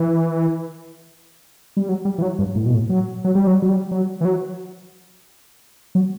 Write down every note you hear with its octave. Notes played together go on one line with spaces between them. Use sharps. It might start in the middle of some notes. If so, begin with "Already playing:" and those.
Already playing: E3
G3
F#3
G3
E3
F#3
G2
A2
B2
A2
F#3
F#3
G3
F#3
F#3
G3
F#3
E3
F#3
F#3